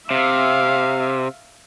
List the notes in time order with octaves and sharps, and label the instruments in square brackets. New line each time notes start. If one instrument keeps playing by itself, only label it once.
[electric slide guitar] C3 [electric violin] E5 F5